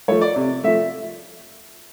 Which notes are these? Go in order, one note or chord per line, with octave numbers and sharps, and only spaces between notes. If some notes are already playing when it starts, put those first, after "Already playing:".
F3 A3 C#5
D5
C3
F3 A3 E5